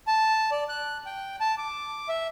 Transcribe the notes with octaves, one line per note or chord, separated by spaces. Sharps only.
A5
D5
F#6
G5
A5
D6
E5